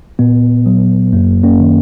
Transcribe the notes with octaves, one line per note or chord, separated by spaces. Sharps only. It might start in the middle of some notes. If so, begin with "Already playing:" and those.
A#2 B3
F#3
F#2 A#3
A#3 C#4
D#3